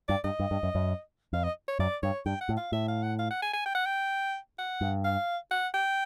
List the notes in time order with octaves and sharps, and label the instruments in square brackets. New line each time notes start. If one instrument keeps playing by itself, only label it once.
[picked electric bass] G2 [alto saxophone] D5
[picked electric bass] G2 [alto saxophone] D#5
[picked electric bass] G2
G2
F#2
F#2
[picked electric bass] F2 [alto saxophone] F5
[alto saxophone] D#5
C#5
[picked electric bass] F#2 [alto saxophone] D5
[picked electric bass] G2 [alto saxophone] C#5
[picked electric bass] G2 [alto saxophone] G5
[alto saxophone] F#5
[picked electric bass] A2
[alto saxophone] F5
[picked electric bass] A2 [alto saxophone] E5
[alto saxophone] F5
F#5
F5
F#5
G#5
G#5
G5
F#5
G5
F#5
[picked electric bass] G2
[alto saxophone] F5
F#5
G5